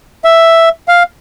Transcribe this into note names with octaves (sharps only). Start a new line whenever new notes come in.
E5
F5